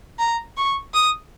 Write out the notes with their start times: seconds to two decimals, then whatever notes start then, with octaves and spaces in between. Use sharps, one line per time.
0.19 A#5
0.57 C#6
0.94 D#6